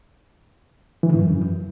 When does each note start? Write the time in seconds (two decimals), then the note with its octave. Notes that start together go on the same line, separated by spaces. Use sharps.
1.03 E3
1.09 D3
1.14 G#2
1.19 F#2